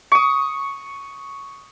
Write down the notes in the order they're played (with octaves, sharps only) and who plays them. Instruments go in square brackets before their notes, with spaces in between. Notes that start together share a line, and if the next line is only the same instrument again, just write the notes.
[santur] C#6 D#6